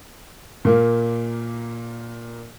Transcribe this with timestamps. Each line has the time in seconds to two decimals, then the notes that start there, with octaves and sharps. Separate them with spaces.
0.65 A#2 A#3